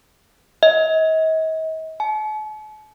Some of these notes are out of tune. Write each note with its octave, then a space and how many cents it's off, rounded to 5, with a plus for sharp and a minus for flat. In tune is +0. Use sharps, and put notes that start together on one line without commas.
D#5 +40
A5 -45